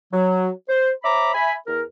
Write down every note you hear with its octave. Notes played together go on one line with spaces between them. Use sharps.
F#3
C5
C5 C#5 E5 A#5 B5 D6
E5 G#5 B5
E2 A#4